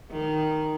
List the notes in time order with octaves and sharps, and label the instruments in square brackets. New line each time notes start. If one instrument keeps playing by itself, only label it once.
[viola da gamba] D#3